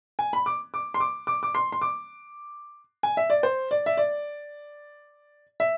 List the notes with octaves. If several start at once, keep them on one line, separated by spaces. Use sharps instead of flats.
G#5
B5
D6
D6
C6
D6
D6
D6
C6
C6
D6
G#5
E5
D5
C5
D5
E5
D5
E5